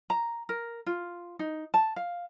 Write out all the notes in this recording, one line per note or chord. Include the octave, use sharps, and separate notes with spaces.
A#5
A#4
F4
D#4
A5
F5